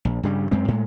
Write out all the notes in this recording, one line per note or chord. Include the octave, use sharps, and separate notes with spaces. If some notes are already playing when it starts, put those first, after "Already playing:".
A#1
G2 C#3 G3
F#2 G#3 C4
A2 G#3